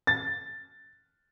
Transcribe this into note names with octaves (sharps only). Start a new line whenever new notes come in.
A6